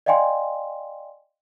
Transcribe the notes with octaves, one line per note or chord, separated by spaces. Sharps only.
D5 D#5 F5 G5 G#5 C6